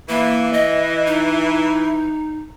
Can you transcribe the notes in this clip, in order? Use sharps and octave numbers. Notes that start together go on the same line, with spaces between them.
E3 A#3
D#5
D#4